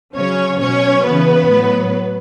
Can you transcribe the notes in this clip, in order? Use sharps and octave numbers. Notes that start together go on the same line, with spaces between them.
C#3 F#3 C#4 C#5
B2 F#3 C#4 C#5
C#3 E3 B3 B4
A2 F#3